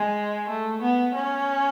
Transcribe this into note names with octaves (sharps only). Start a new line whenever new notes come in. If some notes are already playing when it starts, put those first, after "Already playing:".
Already playing: G#3
A3
B3
C#4